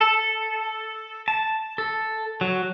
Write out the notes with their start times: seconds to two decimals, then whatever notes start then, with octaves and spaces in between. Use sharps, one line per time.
0.01 A4
1.28 A5
1.78 A4
2.41 F#3